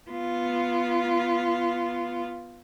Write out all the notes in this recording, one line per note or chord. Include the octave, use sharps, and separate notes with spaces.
B3 F4